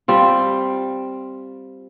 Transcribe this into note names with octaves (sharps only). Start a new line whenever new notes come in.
G3 C4 F4